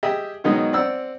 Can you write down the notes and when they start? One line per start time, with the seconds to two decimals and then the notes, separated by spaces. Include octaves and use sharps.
0.03 G4 G#4 D#5 E5 G5 D#6
0.44 B2 D#3 F#3 G#3 B3 D#4
0.73 C4 D5 F#5 E6